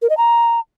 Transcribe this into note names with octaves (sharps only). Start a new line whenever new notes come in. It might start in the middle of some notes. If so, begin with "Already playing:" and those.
A#4
D#5
A#5